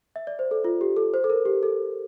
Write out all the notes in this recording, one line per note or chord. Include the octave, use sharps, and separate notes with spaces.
E5
D5
C5
A4
F4
G4
A4
C5
A4
A#4
G4
A4